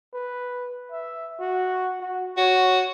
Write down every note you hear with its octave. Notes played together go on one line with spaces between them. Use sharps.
B4
E5
F#4
F#4
F#4 C#5